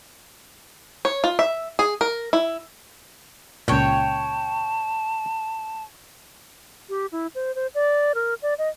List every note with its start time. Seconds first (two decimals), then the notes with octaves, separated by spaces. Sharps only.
1.05 C#5
1.24 F4
1.39 E5
1.79 G#4
2.01 A#4
2.33 E4
3.68 C#2 A#2 C#5 G5 A5
6.89 G4
7.12 E4
7.35 C5
7.55 C5
7.75 D5
8.15 A#4
8.42 D5
8.58 D#5